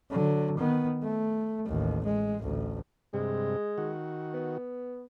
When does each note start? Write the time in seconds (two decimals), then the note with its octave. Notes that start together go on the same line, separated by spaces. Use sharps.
0.11 D3 F#3
0.58 D#3 B3
1.03 A3
1.66 A1 D#2
2.05 G#3
2.41 A1 D2
3.14 G2 C3 G#3
3.78 D#3 F#4
4.34 B3